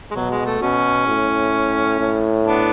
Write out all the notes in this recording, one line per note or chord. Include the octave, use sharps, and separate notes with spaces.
G#3
B2 F#3
G#3
A3
B2 C#4
A2
A2
B3 D4